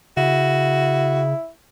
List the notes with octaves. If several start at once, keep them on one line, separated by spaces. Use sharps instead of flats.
C#3 E4 F#4